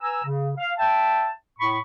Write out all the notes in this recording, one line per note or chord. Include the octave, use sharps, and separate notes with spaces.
B4 G#5 A#5 E6
C#3
F5
E5 G5 A5
A2 B5 C#6